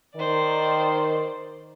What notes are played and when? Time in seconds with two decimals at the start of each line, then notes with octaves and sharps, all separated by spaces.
0.16 D#3 C5 D5